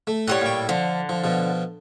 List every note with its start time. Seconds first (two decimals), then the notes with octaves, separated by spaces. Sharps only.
0.07 A3
0.28 A2 G3 C#5 F#5
0.41 A#2 G5
0.69 D3 F3
1.09 F3
1.24 B2 F3